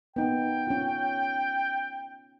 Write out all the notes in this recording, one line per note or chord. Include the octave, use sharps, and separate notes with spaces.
B3 D#4 G5
C#4 F4